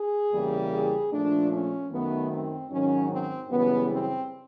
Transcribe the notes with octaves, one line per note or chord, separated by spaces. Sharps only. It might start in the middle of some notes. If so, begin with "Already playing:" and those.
Already playing: G#4
E2 C#3 E3 G3 A#3
G#4
A#2 F3 A3 D4
C#4
F#2 D#3 F#3 A3 B3
C4
G#2 D#3 F#3 C#4
C4
F#2 C#3 E3 G3 B3
C4